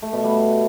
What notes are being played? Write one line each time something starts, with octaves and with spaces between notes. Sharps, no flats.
A3
B2
G3